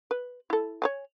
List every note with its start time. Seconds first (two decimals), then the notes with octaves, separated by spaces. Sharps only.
0.11 B4
0.50 E4 A4
0.82 C#5 F5 G#5